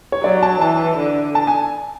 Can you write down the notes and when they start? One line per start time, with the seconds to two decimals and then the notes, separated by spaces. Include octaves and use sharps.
0.12 C#5
0.24 F#3 D5
0.42 A5
0.61 E3 A5
0.98 D3
1.35 A5
1.47 G#5